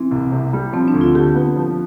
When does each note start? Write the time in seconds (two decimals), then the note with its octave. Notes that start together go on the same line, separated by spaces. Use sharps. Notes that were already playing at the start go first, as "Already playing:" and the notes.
Already playing: E3 C4
0.11 C2
0.32 C3
0.53 G3
0.73 F3 C4
0.88 D4
0.94 D2
1.01 F4
1.15 D3 G4
1.35 B3
1.56 F3